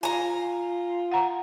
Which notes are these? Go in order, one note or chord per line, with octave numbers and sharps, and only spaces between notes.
F4 G#5 A#5
F#5 A#5